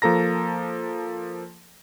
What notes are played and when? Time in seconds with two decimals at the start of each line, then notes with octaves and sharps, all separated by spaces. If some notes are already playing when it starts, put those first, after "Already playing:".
0.02 F3 A#3 A4 A#5 A#6